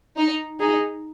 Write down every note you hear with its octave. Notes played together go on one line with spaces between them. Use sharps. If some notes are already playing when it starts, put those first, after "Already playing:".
D#4
D#4 G#4